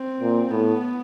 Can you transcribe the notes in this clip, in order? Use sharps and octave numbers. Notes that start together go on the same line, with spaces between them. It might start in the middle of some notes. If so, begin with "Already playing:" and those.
Already playing: C4
A#2
A2 B3